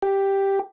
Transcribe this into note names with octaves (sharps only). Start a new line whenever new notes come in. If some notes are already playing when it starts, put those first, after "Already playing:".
G4